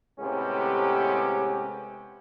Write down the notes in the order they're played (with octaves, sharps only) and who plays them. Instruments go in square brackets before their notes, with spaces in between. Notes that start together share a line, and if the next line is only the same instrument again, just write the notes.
[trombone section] A2 C3 G#3 B3 C#4 G4